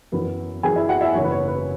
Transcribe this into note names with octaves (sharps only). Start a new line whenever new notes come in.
F#2 E3 B3
F#2 E3 B3 G#4 G#5
E4 E5
F#4 F#5
E4 E5
F#1 F#2 E3 B3 C#5
B4
C#5
B4